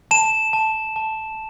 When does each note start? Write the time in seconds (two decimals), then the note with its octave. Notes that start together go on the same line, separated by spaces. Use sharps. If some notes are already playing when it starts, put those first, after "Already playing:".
0.11 A5 E7
0.53 A5
0.96 A5